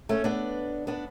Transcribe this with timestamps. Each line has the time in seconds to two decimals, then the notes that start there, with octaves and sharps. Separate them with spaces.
0.09 A3 C#4
0.24 B3 D4
0.87 B3 D4